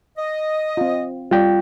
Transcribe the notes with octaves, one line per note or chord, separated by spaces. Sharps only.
D#5
C4 F4
G3 F4 D5 G5